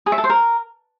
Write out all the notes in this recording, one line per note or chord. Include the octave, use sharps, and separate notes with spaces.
G#4
E5
A4
C5
A#4